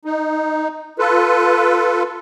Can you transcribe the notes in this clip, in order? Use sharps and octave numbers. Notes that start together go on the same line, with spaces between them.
D#4
F4 A4 B4